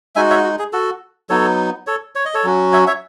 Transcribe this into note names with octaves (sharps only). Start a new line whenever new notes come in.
G#3 D#4 F#4 E5 G#5
C#5 E5
F#4
G#4
F#4 A4
F#3 B3 D#4 A4 C#5
A4 C#5
C#5
D#5
A4 C#5
F#3 C#4 F#4
C#5 E5
C#5 E5